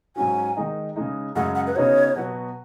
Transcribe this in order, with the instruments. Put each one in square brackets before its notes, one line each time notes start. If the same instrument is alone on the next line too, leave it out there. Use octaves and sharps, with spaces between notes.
[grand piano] G#2 F#3 C#4 F#4 [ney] G#5
[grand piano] D#3 G#3 D#4
C#3 G#3 D#4
[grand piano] F#2 C#3 G#3 [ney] F#5
[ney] F#5
B4
[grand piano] C#3 B3 D#4 F#4 [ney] C#5
[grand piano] B2 F#3 B3 F#4